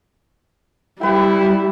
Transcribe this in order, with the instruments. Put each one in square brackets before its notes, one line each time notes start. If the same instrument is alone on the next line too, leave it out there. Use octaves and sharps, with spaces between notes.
[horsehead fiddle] G3 [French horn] E4 [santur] G4 B4 G5